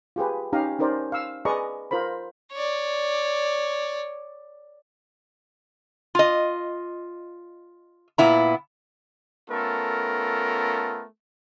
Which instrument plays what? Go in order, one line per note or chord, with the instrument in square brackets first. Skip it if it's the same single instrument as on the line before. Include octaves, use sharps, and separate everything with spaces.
[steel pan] F4 G4 G#4 B4
C#4 D#4 G4 F5 A#5 D#6
C#4 D#4 A#4 C5 D5
F5 E6
G#4 B4 D5 D#5 A#5 C#6
F4 A#4 C5 B5
[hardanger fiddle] C#5 D5
[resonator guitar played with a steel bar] F4 D#5
A#2 B3 E4 A#5
[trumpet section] A3 B3 C#4 F4 A4 A#4